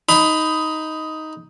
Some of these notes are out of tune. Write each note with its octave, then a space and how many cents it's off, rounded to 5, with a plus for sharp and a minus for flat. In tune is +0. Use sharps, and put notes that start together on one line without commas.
D#4 +10 B5 +20